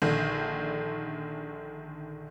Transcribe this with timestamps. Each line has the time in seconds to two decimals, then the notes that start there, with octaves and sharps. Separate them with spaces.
0.02 A#1 D3 D#3